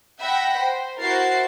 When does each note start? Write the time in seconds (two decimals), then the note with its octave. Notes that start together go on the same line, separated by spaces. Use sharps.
0.20 E5 F#5 G5 B5 A#6
0.59 C5
1.00 E4 F#4 A#4 C5 A6 C7